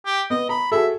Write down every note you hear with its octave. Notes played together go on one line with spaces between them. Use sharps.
G4
B3 D#5
A#5 B5
F#4 G#4 A4 E5